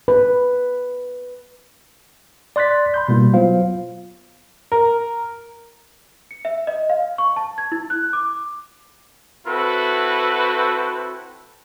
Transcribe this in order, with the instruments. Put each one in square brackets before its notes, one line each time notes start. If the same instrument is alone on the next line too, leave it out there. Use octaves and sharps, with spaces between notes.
[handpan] B4
[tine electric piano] D5 C6 F#6 A6 B6
B5 C6 G6
B2 G3 A#3 E4
F#3 B3 F4 C5 F5
[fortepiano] A#4
[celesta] C#7
E5
D#5
F5
C#6
A5
G#6
E4
F#6
D6
[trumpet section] C4 E4 F#4 A4 B4